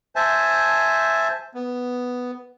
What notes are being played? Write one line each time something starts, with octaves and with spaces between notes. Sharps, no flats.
C5 E5 G#5 A5
B3